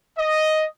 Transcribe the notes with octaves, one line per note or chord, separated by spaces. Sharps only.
D#5